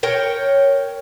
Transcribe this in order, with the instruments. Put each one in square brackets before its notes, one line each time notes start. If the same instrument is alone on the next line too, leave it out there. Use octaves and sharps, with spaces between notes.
[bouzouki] A#4 C#5 G5